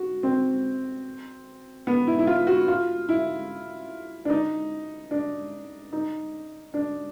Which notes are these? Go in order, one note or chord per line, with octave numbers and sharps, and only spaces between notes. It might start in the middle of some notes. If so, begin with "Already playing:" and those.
Already playing: F#4
C4
B3
E4
E4
F4
F#4
F4
E4
D4
D#4
D4
D#4
D4